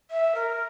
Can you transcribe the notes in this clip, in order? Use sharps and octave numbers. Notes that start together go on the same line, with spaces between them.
E5
A#4